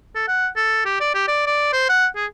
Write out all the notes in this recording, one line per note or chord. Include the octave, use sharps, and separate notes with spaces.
A4
F#5
A4
G4
D5
G4
D5
D5
C5
F#5
G#4